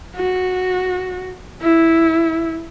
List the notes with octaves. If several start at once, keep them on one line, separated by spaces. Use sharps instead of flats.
F#4
E4